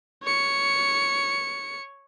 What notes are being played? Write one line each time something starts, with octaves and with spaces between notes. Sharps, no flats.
C#5 C#7